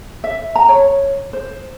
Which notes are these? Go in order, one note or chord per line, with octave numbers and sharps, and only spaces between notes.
E5
A#5
C#5
C5